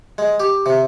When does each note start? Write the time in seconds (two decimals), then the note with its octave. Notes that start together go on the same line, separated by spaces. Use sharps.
0.18 G#3
0.40 G4
0.66 C3